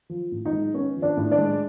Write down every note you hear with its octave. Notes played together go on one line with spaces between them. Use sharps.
F3
A2
D#4 D#5
G#3
B3 C#4 C#5
F3
D4 D5
A2
D4 D5
G#3